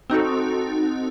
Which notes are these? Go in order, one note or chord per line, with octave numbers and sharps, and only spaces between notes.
C4 D#4 F#4 A4